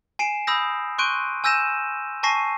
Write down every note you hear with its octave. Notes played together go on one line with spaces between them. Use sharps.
G#5 C7 D7 E7
B5 D#6 E6 G6 A#6
C6 C#6 F#6 G6 D7 D#7
G#5 E6 G6 A#6 D#7 E7
G#5 A5 C#6 A#6 C7 D#7